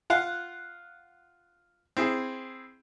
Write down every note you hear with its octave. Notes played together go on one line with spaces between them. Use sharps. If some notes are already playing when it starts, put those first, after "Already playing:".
F4 F5 F#5
C4 E4 G#4